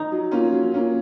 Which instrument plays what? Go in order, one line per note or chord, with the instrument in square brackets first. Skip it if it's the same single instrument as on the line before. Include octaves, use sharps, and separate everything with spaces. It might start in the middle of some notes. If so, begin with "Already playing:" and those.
Already playing: [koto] D#4
[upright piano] F#3
A#3 C#4 F4
F#3
A#3 C#4 F4